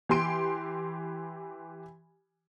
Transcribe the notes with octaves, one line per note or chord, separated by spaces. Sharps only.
E3 G4 C6 D7